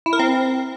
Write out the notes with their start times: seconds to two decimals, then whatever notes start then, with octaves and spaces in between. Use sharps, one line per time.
0.06 E4
0.13 A#4
0.19 C4